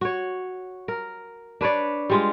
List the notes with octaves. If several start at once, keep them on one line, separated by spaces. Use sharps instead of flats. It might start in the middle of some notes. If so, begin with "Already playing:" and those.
F#4 C#5
A#4
D4 B4 C#5 D5
G3 G#3 F4